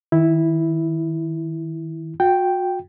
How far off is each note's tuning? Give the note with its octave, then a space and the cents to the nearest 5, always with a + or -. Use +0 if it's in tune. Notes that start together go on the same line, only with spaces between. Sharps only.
D#3 +25 E4 -5
F#4 -35 G5 +0